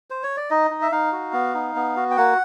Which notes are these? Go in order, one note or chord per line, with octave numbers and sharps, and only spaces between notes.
C5
C#5
D5
D#4 D#5
D#4
E5
D#4 F5
F#4
B3
D#4
B3
F#4
G5
A#3 F#5